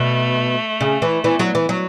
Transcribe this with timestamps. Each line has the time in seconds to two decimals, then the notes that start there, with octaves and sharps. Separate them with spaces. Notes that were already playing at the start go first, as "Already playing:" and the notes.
Already playing: B2 A3
0.81 C#3
1.02 E3
1.24 E3 B3
1.39 F#3
1.55 E3
1.69 F#3